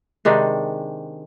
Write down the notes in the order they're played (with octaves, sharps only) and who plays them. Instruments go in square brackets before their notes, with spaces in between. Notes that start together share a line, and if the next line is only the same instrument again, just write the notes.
[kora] C3 D#3 G#3 D4